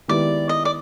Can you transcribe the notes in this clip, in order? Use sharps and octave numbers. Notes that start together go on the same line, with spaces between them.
D#3 G#3 B3 E4 G4 D5
D#5
D5